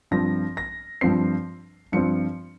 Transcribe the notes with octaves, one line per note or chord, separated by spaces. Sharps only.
G2 F3 C4 A#6
A#6
G2 F3 C4 C7
G2 F3 C4 C#7